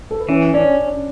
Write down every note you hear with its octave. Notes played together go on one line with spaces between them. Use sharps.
A4
B4
E3 C#4 C#5
C#4 D4 D5